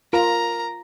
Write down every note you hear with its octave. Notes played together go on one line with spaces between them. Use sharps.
F4 A#4 A#5